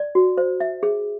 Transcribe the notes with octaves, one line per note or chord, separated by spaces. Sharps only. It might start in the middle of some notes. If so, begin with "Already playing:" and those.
Already playing: D5
F#4
C5
E5
G#4